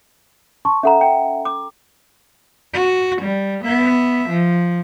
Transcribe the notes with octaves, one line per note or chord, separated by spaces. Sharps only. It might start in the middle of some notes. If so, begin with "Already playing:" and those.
A5 C6 C#6
C#4 A4 E5 F#5 A#5
G5
D6
F#4
G3
B3 E5
F3